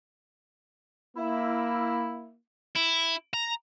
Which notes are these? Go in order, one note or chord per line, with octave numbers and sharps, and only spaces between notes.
A#3 E4
E4
A#5